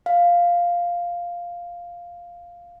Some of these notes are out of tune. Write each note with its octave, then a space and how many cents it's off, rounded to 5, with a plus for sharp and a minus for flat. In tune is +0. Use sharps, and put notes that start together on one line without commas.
F5 +0